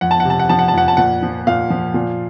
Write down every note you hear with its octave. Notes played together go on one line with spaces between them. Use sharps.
F2 F#5
A5
F#5
C3 A5
F#5
F3 A5
F#5
A5
F2 F#5
A5
A#2 F#5
F3
A#2 F5
F3
A#2